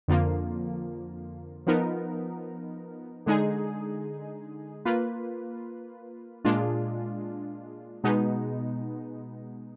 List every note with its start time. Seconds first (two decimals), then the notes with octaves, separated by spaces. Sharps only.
0.08 F2 D3 F3 A#3 F4
1.67 F3 B3 D#4 A#4
3.26 D3 G#3 D#4 G#4
4.85 A#3 F4 B4
6.45 A#2 G#3 D4 F4
8.04 B2 G#3 B3 D#4